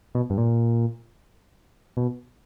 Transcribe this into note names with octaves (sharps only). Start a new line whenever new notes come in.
B2
G2
A#2
B2